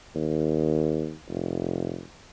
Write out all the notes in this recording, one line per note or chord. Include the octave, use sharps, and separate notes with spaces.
D#2
F1